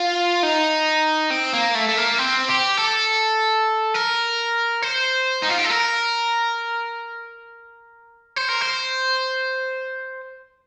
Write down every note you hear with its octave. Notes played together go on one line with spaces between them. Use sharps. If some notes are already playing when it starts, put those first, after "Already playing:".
Already playing: F4
D#4
C4
A#3
A3
A3
A#3
C4
G4
A4
A#4
C5
D#4
F4
G4
A4
A#4
C5
A#4
C5